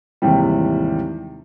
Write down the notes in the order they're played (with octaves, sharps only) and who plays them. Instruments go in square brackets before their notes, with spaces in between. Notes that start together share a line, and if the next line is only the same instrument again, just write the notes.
[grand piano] D#2 G#2 C3 E3 G3